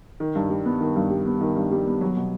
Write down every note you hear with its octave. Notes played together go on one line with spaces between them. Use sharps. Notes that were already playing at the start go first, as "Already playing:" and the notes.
D#3
G2
G3
B3
D#3
G2
G3
B3
D#3
G2
G3
B3
F#3
B2